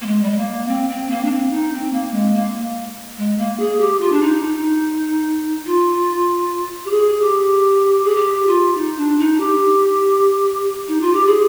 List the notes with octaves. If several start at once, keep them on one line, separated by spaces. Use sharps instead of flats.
A#3
G#3
G3
G#3
A#3
C4
C4
A#3
D4
C4
D#4
C4
A#3
G#3
A#3
G#3
A#3
G#4
G4
F4
D4
D#4
D#4
F4
G4
G#4
G4
G#4
G4
F4
D#4
D4
D#4
G4
D#4
F4
G4
G#4